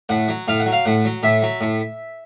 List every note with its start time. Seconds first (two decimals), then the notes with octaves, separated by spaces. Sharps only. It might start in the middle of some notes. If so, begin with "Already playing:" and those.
0.09 A2 F#5
0.29 F#3
0.48 A2 F5
0.60 F#5
0.66 F#3
0.72 F5
0.85 A2 F#5
1.05 F#3
1.23 A2 E5
1.42 F#3
1.61 A2